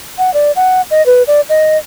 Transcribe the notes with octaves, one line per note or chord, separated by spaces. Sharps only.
F#5
D5
F#5
D#5
B4
D5
D#5